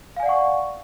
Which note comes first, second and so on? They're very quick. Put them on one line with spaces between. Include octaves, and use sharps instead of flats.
F5 G#5 D5 F#5 C#6